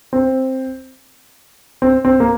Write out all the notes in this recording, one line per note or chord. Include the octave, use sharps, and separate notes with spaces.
C4
C4
C4
A#3